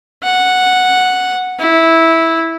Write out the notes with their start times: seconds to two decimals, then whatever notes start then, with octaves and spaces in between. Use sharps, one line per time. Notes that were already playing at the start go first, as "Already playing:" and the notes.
0.23 F#5
1.60 E4